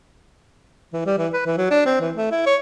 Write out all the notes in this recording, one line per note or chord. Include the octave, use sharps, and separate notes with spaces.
E3
G3
E3
B4
E3
F#3
D4
C4
E3
A3
E4
C#5